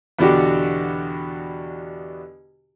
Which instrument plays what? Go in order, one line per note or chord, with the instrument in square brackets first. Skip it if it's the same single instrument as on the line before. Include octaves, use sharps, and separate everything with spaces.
[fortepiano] E2 B2 D3 D4 F#4 G4